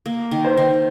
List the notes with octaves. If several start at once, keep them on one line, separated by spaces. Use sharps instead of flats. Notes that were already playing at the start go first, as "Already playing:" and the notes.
A#3
D#3
C5
D#3